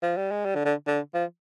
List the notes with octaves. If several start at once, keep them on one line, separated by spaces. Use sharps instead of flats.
F3
G3
G#3
G3
D3
D3
D3
F3